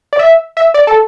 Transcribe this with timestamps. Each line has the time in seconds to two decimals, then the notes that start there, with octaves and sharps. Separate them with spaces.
0.13 D5
0.19 E5
0.57 E5
0.74 D5
0.87 A4